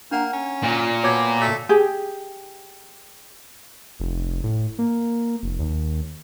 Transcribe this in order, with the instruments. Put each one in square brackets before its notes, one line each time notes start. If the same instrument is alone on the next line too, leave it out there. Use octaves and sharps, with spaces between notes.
[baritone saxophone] A#3 [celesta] D4 F#5 A#5
[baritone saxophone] C#4
[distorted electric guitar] A#2
[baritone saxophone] B2 [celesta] C#5 D6 G#6
[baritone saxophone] A3
[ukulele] G4 G#4
[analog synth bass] F1
A2
A#3
F1
D#2